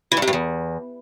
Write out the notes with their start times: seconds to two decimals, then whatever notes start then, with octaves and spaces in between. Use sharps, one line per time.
0.12 E3
0.17 G2
0.22 C3
0.27 G2
0.33 E2